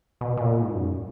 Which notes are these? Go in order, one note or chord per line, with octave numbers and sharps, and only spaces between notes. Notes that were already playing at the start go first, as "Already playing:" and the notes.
B2
B2
A#2
G#2
F#2